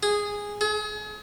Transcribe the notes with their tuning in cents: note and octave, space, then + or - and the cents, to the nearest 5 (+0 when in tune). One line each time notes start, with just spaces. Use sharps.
G#4 -10
G#4 +35